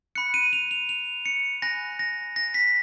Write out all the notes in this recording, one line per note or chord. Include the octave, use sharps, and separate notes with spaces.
B5 F#6 C#7
D#7
F7
F7
F7
C#7
G#5 B5 F#6 A#6
A#6
A#6
B6